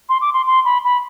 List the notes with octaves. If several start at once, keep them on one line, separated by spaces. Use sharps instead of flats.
C6
D6
C6
C6
B5
B5